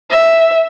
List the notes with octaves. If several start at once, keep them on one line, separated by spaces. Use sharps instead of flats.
E5